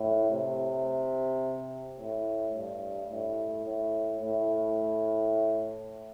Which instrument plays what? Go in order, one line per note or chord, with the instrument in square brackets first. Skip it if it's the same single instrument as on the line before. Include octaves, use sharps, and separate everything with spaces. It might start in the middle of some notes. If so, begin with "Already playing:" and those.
Already playing: [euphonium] A2
C3
A2
G2
A2
A2
A2